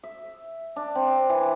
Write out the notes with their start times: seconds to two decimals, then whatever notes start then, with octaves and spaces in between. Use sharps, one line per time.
0.03 E5
0.76 D4
0.95 C4
1.29 E3